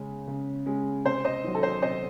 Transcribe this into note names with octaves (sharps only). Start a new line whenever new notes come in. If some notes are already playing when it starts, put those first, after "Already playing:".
Already playing: C#3 G#3 C#4
C#3
G#3 C#4
C3 C5
C5 D#5
D#3 F#3
A4
C5
C3 C5 D#5